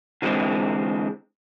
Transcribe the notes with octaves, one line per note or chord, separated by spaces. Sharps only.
D3 E3 G#3 C4